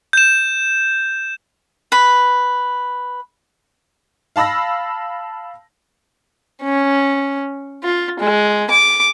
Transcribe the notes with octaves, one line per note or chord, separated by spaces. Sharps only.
G6 E7
B4 B5
F5 A5 B5 E6 A#6
C#4
F4
G#3
D6